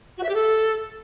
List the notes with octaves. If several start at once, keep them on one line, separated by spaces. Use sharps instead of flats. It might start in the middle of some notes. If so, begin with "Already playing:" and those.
F#4
E5
G4
A4